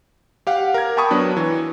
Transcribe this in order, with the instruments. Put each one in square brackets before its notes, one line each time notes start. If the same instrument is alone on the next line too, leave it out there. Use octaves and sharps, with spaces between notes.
[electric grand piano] G4 F5 F#5
A#4 G#6
G5 A5 B5 C#6 D#6
F#3 B3 D4
E3